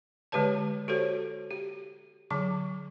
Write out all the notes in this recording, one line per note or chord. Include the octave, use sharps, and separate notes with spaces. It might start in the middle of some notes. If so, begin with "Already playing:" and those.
D3 G#3 G4 B4 C#5 A5
F#4 G4 A4 C5 C#5
G4
D3 F#3 D6